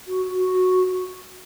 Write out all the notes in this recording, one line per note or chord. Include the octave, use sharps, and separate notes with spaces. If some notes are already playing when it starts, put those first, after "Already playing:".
F#4
F#4